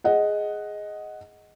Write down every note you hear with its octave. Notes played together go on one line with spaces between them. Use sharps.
G#4 D#5 F#5